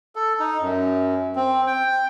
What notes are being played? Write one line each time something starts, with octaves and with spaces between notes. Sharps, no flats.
A4
D#4
F#2
C4
G5